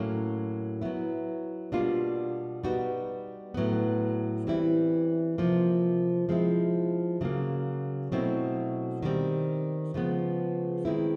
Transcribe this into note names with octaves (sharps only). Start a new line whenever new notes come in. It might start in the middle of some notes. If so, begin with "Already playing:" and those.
Already playing: A2 F#3 A#3 C#4
F#3 B3 E4
B2 G3 A#3 D4 F4
G3 B3 D#4 F#4
A2 F#3 B3
E3 G3 C4 E4
C3 F3 A#3
F3 G#3 C4 E4
C#3 F#3 A#3
B2 F#3 A3 C4 E4
D#3 G3 C4
C#3 F3 G#3 B3
D#3 G#3 C4 E4